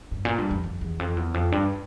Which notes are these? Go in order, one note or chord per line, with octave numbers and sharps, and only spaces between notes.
G2
A#2
G2
F2
F2
E2
F2
E2
F2
G2